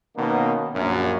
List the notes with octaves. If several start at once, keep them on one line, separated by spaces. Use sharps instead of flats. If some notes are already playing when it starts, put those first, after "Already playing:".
B2 D#3 A#3 B3 C#4 D#4
A#1 F#2